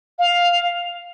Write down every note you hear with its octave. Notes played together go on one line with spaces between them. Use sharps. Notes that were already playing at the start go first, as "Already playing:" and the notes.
F5